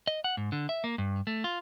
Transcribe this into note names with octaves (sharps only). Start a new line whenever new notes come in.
D#5
F#5
G#2
D3
E5
A#3
G2
A3
F4